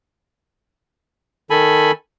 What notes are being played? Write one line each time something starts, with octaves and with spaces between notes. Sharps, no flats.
D#3 A4 G#5 B5